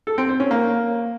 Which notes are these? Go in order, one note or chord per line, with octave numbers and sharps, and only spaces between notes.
A4
C4
C5
C#4
A#3